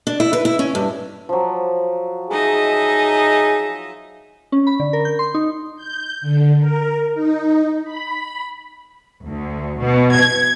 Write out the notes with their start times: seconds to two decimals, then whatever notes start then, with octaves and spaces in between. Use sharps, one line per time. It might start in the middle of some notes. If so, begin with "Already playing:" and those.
0.07 D4
0.20 E4
0.33 B4
0.45 E4
0.59 C#4
0.75 G2
1.29 F3 F#3
2.31 D#4 G#4 D#5 E5 A#5
4.52 C#4
4.67 B5
4.80 D3
4.93 A#4
5.05 G6
5.19 C6
5.34 D#4
5.76 G6
6.21 D3
6.60 A#4
7.15 D#4
7.84 B5
9.25 D2
9.80 B2
10.17 G#6